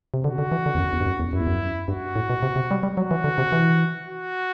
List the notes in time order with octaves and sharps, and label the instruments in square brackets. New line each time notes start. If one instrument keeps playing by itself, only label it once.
[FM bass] C3
[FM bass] D3 [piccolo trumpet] F#4
[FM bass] D3
E3
D3
E2
F#2
E2
G2
F#2
E2
[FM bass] F#2 [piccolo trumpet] E4
[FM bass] E2
F#2
[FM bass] G2 [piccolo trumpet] F#4
[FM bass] A2
B2
C3
C3
G3
G3
[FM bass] F#3 [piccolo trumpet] F#4
[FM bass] E3
D3
C3
E3
[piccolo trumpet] F#4